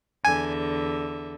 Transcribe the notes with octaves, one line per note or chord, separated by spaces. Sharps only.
E2 D3 E5 G#5